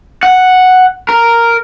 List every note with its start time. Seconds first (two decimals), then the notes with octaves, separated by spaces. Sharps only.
0.23 F#5
1.09 A#4